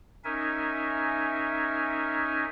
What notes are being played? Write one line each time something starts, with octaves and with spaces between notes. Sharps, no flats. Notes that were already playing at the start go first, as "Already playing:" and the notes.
C#4 D#4 A#4 E5 G#5